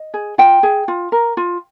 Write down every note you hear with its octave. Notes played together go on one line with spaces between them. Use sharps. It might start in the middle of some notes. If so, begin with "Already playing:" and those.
Already playing: D#5
G#4
F4 G5
G#4
F4
A#4
F4